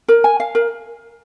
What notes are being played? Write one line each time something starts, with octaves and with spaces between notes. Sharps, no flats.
A#4
G#5
F5
A#4